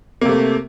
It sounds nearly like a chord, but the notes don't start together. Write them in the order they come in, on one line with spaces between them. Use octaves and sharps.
A#3 C3 A3